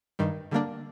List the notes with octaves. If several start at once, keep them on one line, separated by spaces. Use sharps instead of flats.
G2 D#3 G3
D3 G3 A#3 D4